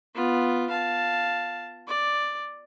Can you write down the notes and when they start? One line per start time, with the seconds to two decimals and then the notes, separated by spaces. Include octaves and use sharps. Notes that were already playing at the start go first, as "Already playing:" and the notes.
0.14 B3 F4
0.70 F5 A5
1.87 D5